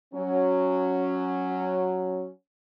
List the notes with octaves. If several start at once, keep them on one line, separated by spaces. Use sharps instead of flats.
F#3 C#4